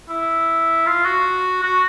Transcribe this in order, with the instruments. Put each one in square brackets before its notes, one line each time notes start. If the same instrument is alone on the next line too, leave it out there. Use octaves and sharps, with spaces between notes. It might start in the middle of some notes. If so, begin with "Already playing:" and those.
[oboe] E4
F4
F#4
F#4